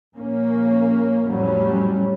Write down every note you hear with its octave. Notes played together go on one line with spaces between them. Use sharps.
A#1 A#3 C#4
F2 A2 F#3 G3 C#4